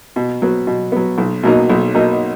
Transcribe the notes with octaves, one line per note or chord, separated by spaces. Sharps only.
B2
F#3 B3
B2
F#3 B3
B1
B2 F#3 A#3 D#4
B1
B2 F#3 A#3 D#4